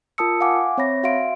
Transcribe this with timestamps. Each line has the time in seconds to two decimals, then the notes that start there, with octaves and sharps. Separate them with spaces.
0.18 F4 A#4 A5 D#6 E6 C#7
0.41 F5 F#5 G#5 D6
0.78 C4 C#5 E5 B5 A#6
1.03 F#4 E5 F5 C6 D7